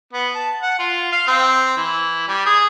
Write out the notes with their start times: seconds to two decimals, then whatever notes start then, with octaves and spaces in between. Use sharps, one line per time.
0.13 B3
0.35 A5
0.62 F#5
0.79 F4
1.12 F5
1.27 C4
1.77 E3
2.28 G3
2.46 G#4